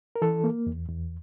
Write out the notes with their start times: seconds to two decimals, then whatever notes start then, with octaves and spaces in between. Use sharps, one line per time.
0.16 A#4
0.22 E3 A4
0.44 A#3
0.67 E2
0.89 E2